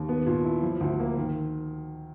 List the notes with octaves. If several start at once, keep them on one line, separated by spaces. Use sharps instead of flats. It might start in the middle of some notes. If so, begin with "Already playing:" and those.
Already playing: D#2
B3
A#2
E4
F3
D2
A#3
D#3